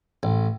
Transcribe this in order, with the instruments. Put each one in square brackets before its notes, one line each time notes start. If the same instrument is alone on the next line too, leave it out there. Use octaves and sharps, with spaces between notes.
[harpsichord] A1